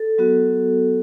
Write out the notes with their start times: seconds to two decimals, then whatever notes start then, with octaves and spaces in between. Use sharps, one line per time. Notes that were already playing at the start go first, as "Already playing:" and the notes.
Already playing: A4
0.18 F#3 B3 F#4